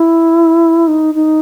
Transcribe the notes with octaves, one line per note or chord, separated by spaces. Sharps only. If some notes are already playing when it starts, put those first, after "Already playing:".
Already playing: E4
D#4
D#4